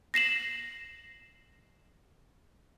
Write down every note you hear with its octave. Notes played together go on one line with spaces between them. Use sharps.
A#6 C7 E7 F#7